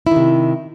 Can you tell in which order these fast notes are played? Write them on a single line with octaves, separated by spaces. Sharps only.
E4 D#3 C3